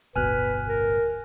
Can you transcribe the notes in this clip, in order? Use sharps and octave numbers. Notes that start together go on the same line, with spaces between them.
D1 G1 B2 B4 G#5 F6 F#6
A#4